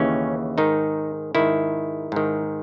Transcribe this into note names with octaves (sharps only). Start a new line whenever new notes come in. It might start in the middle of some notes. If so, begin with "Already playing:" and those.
Already playing: D#2 C#3 E3 C#4
G#2 D#3 D#4
G#2 D#3 E4
G#2 D#3